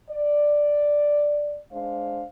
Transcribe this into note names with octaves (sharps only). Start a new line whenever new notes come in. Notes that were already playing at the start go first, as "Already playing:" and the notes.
D5
G#3 D4 C5 F5